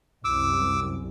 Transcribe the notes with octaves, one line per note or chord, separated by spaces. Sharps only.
C2 F#2 D6 E6